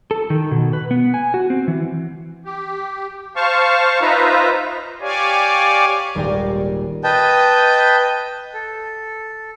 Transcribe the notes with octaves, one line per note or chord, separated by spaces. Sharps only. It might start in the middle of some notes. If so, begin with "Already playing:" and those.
A4
D#3
B2
B4
B3
G#5
F#4
C4
E3
G4
C5 F5 A5 C#6
D#4 F4 B4 C5 E5 A#5
G4 C#5 D5 F5 G#5
D#1 G#1 G3 D5 G5 A#6
B4 D#5 G5 A5 G6
A4